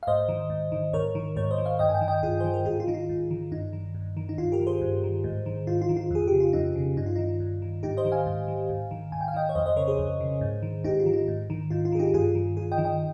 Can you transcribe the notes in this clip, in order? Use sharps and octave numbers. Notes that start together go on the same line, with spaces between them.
F5
G#2 C5 D#5
D#3
G#2
D#3
G#2 A#4 C#5
D#3
G#2 A#4 C#5
C5 D#5
D#3
C#5 F5
G2 D#5 G5
G#5
D#5 G5
D#3
D#5 G5
G2 F4 G#4
D#3 C5
A#4
G#2 F4 G#4
F4
D#3 D#4
F4
G#2
D#3
G2 D#4
D#3
G2
D#3
D#4
G2 F4
G4 A#4
D#3
G#4 C5
G2
D#3
G#2
D#3
G#2 F4
F4
D#3
F4
F2 G#4
C#3 G4
F4
F2 D#4
C#3
G2 D#4
F4
D#3 D#4
G2
D#3
G#2 D#4 G4
C5 D#5
D#3
F5 G#5
G#2
D#3
G#2
D#3
G#2 G#5
G5
F5
D#3 D#5 G5
C#5
F2 C5 D#5
C5 D#5
C#3 A#4 C#5
G#4 C5
F2
C#3
G#2
D#3
G#2 D#4 G4
F4
D#3
D#4
G#2
D#3
G#2 F4
F4
D#3 G#4
D#4 G4
G2 F4 G#4
D#3
G2 F4 G#4
D#5 G5
D#3
D#5 G5